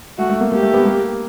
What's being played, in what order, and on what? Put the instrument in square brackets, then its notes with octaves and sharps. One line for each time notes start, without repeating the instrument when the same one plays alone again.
[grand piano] A3 [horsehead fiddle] F#4
[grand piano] A3
A#3
[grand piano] A#3 [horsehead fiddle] G4
[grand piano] A3
B3
A#3